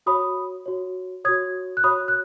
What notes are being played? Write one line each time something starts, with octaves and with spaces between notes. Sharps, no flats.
F#4 C#5 B5 D#6
F#4 C#5
F#4 C#5 D#6 G#6
F#6
F#4 C#5 B5 D#6
F#6